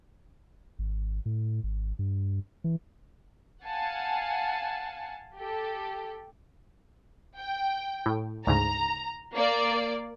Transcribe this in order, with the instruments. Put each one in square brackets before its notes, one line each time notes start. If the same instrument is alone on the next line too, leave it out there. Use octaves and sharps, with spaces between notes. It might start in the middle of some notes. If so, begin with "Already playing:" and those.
[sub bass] G#1
A2
G#1
G2
E3
[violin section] F5 F#5 G#5 A5
G4 A4
G5
[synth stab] A2
[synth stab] D2 G#2 C#3 [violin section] A#5
[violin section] A#3 D5